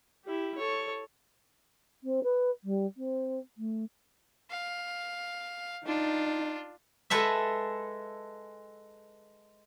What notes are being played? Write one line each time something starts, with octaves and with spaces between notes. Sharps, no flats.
E4 G4
A4 C#5
C4
B4
G3
C4
A3
F5
D4 D#4 F4
G#3 A4 B4 E5